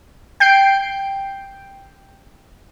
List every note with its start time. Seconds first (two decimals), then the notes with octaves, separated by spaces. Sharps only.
0.40 G5 G6 C7 D7